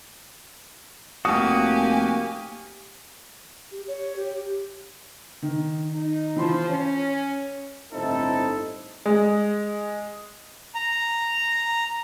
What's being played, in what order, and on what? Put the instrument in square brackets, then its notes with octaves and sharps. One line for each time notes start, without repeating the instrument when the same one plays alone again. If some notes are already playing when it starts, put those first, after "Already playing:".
[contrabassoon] F1 [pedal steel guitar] A#3 F#4 [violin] G4 G#5 [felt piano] D#6
[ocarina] G4
C#5
G4
[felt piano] D#3
[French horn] D#4
[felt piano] E3 B5 C6 [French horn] F3
[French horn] C#4 [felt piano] C#5
[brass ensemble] G1 A2 C4 D#4 E4 A4
[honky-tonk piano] G#3
[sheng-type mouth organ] A#5